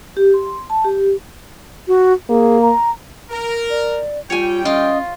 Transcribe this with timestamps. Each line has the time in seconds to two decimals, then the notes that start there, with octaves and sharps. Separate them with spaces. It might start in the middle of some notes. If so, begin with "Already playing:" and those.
0.17 G4
0.34 C6
0.70 A5
0.85 G4
1.88 F#4
2.29 A#3 G#4
2.62 A#5
3.30 A#4
3.70 D5
4.30 G3 F4 C#5 G5 G#5
4.65 C#4 F4 D#5